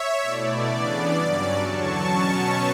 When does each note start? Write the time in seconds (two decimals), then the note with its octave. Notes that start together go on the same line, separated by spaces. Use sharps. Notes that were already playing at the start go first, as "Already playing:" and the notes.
Already playing: C#5 E5
0.21 B2 A3 E4 D5
0.66 C#3 E3 B3 D4
1.11 G2 F#3 C#4 D5
1.56 E2 D3 F#3 A5 C#6
2.01 B2 F#3 C#4